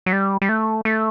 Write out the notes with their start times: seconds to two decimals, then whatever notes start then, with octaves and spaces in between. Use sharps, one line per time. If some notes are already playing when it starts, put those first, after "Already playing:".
0.06 F#3
0.13 G3
0.42 G3
0.49 A3
0.85 A3